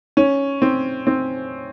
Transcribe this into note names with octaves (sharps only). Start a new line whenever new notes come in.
C#4
C4
C4